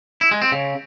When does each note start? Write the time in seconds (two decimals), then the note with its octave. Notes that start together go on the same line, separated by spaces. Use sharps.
0.21 E4
0.31 G#3
0.42 C4
0.52 C#3